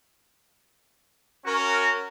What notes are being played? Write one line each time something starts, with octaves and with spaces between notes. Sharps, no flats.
C#4 F#4 A#4